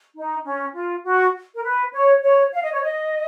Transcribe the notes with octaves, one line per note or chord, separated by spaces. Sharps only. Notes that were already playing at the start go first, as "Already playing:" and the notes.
D#4
C#4
F4
F#4
A#4
B4
C#5
C#5
F5
D#5
C#5
D#5